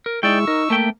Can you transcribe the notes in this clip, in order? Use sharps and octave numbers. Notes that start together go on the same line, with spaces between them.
A#4
G#3 D#4 E4 D5 G5 C#6 E6
D#4 A#4
A3 A#3 E5 G5